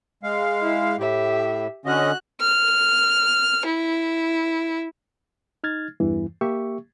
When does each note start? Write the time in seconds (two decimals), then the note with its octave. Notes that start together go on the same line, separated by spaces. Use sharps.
0.23 G#3 F5
0.61 E4
0.98 A2 G4 E5
1.86 D3 C#4 F#4 D#5 F#6
2.41 F6
3.65 E4
5.64 D#4 F6 G#6 A6
6.00 E2 G2 E3
6.41 A#3 G4 E5 C#6